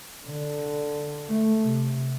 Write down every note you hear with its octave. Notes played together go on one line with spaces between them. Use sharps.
D3
A3
C3